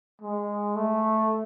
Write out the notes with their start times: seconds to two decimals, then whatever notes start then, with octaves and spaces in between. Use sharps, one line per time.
0.22 G#3
0.75 A3